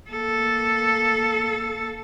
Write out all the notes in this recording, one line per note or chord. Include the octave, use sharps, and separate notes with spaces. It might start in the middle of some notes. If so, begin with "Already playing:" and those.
A#3 A4